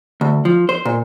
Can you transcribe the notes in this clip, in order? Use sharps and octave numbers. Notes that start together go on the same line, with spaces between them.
D2
F3
C5
A#2